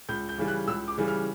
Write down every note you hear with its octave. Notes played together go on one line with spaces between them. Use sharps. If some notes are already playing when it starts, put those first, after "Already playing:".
C#2 G6
G6
C#3 E3 G3
F#6
C#2 E6
D6
C#3 E3 G3
F6